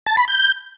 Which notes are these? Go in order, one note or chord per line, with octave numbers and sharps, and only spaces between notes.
A5
B5
G6